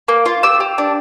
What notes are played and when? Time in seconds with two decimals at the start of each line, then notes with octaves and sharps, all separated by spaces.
0.08 A#3
0.25 F4
0.43 G4 E6
0.60 G4
0.78 D4